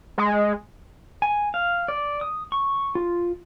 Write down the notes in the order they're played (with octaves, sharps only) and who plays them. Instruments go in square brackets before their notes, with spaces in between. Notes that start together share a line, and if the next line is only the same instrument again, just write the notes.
[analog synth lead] G#3
[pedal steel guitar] G#5
F5
D5
D#6
C#6
F4